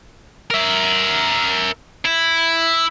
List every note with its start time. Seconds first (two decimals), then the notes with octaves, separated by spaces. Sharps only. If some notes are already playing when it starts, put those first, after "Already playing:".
0.51 A#4 E5
2.05 E4